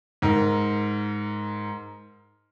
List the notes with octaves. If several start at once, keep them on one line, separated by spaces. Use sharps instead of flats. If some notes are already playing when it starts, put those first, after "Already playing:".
G#2 A#4